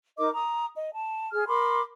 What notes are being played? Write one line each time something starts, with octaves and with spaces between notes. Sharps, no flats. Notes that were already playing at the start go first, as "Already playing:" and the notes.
D#4 A#4 D#5 D6
A#5 D#6
D#5
A5
G#4 F6
A#4 B5 C6 D6